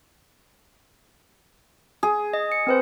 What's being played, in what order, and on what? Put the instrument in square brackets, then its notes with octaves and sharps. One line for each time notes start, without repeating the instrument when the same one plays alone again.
[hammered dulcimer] G#4
[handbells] D#5
C#7
C4 B4 C5